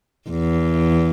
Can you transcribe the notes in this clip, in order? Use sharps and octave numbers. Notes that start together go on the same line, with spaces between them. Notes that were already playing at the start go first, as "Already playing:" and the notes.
E2